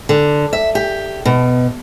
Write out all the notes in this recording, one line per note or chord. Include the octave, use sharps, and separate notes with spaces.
D3
E5
G4
B2